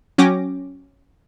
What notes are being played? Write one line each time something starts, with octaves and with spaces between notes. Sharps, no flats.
F#3 C#4 F#4 G5 D6 A#6